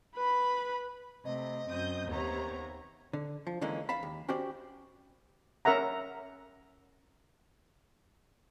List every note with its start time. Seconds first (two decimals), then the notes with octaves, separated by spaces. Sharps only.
0.15 B4 B5
1.25 C3 A3 D#5
1.69 F#2 C4 D#6 G6
2.08 D#2 C3 B3 C#5 A#5
3.13 D3
3.47 F3
3.61 D3 E3 G#3 A#3 C#4
3.89 F5 A5 B5
4.03 D#2
4.28 C#4 F#4 G4 C5 D5
5.65 C#4 A#4 E5 F#5 A#5